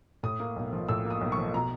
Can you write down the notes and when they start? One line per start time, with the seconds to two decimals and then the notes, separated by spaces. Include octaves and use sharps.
0.23 A2 D#6
0.40 A#3
0.56 B1
0.73 F3
0.89 A2 E6
1.05 A#3
1.10 D#6
1.21 B1
1.32 C#6
1.38 F3
1.54 B2 A#5